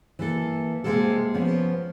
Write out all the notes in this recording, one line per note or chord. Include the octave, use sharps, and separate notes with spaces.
E3 A#3 A4
C3 G#3 A#3 A4
F3 B3 C#4